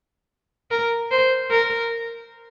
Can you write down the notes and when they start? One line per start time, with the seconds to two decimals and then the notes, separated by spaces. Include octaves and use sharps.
0.71 A#4
1.11 C5
1.51 A#4